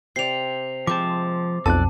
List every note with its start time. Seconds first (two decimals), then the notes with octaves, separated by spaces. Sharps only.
0.16 C3 D5 C7 F7
0.87 F3 G#3 C4 A5 D6
1.66 B1 F2 A4 D5 A5 F#6